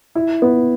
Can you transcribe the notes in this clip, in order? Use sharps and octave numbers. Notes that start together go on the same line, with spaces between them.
E4
B3